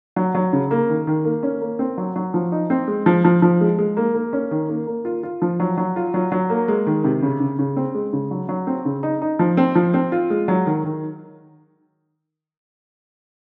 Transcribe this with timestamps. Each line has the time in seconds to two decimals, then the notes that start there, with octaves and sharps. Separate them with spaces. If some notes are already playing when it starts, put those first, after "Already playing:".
0.16 F#3
0.35 F#3
0.53 C#3
0.71 A#3
0.89 D#3
1.07 D#3
1.25 A#3
1.43 C#4
1.61 A#3
1.79 C4
1.98 F#3
2.16 F#3
2.34 F3
2.52 D#4
2.70 C4
2.87 G#3
3.06 F3
3.24 F3
3.42 F3
3.60 G#3
3.78 G#3
3.97 A#3
4.14 A#3
4.33 C#4
4.51 D#3
4.69 A#3
4.87 A#3
5.05 F4
5.23 F4
5.42 F3
5.60 F#3
5.77 F#3
5.96 F4
6.14 F#3
6.32 F#3
6.50 A#3
6.68 G#3
6.87 D#3
7.04 C3
7.22 C#3
7.40 C#3
7.59 C#3
7.76 C4
7.95 G#3
8.13 C#3
8.31 F#3
8.49 F#3
8.67 C4
8.85 C#3
9.03 D#4
9.22 D#4
9.39 F3
9.57 C4
9.75 F3
9.94 C4
10.12 F4
10.30 G#3
10.48 F#3
10.66 D#3
10.84 D#3